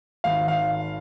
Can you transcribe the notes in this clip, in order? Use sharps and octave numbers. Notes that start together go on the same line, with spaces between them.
G#1 F5
F5